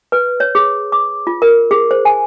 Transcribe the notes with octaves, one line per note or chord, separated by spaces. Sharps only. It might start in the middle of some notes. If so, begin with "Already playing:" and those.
B4
C#5
G#4
D6
F4
A#4
G#4
C5
G#5